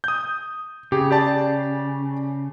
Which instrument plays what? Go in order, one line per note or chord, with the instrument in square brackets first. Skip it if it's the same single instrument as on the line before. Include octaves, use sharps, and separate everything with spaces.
[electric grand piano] D#6 G6
[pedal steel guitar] C#3 [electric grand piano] G4 G#4
[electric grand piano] G4 D5 A5